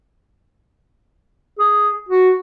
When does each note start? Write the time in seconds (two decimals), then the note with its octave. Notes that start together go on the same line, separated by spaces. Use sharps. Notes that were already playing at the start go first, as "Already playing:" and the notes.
1.59 G#4
2.09 F#4